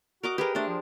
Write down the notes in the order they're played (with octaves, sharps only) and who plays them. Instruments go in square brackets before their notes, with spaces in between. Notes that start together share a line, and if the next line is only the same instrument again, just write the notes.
[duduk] F#4 [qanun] A#4 D#5 D6
[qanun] G4 G#4 A#4 [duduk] B4
[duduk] A3 [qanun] D4 C5
[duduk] F3